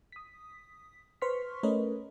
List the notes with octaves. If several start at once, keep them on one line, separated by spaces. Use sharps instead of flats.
D#6 B6
B4 C5 C6 C#6 F6 B6
A3 C#4 A#4 B4 C#5 D#5